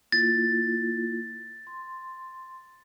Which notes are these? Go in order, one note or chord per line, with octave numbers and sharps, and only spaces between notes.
A#3 E4 F4 A6
C6